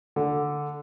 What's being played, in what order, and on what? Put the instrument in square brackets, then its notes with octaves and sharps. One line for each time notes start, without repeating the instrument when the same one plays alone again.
[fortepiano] D3